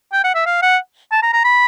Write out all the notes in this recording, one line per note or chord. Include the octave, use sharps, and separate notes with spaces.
G5
F#5
E5
F5
F#5
A5
A#5
A#5
B5